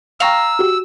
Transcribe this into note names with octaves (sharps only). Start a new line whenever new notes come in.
F5 G5 A#5 C#6 E6 F6
F#4 G4